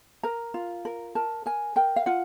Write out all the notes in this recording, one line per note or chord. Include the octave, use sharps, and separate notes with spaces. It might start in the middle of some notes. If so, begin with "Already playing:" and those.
A#4 A#5
F4
A#4
A#4 A5
A#4 G#5
A#4 G5
F5
F4 F#5